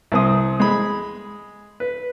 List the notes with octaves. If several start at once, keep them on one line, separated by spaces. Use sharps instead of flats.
C2 C4 D#6
G#3 B5
B4